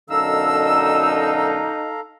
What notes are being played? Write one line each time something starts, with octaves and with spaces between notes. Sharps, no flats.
F#2 B2 D3 D#4 A4 F5 A#5 E6